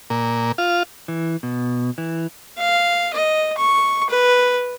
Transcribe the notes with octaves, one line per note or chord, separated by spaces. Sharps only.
A#2
F4
E3
B2
E3
F5
D#5
C#6
B4